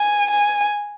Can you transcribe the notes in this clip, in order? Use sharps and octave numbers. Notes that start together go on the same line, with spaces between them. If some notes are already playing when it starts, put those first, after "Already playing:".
Already playing: G#5
G#5